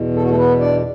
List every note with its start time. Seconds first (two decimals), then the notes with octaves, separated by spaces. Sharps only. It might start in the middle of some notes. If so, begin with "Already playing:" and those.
Already playing: E2 B2
0.15 A4
0.23 F#4
0.30 A3 A4
0.37 B3 B4
0.60 D4 D5